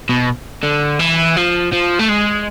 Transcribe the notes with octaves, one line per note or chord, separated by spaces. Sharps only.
B2
D3
E3
F3
F3
A3
G#3